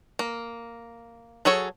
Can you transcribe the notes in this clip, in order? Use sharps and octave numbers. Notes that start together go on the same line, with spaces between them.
A#3
F#3 G#4 A4 C#5